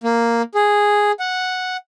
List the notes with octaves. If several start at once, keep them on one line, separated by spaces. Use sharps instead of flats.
A#3
G#4
F#5